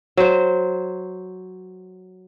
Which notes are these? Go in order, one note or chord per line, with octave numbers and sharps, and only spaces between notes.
F#3 C5